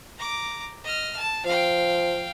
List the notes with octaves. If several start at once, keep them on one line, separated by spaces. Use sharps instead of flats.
A#5 D6
D#5 F6
A5
F3 F5 G5